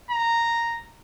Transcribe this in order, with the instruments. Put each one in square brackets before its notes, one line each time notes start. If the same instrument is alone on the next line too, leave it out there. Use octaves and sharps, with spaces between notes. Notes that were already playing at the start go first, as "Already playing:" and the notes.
[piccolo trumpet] A#5